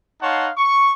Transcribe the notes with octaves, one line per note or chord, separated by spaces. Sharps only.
D#4 C#5 F5 F#5 A5 C6
C#6